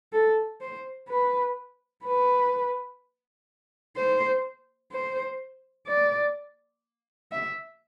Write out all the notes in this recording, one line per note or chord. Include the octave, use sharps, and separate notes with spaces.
A4
C5
B4
B4
C5
C5
D5
E5